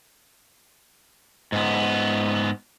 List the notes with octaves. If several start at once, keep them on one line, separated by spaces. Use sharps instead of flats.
G#2 B3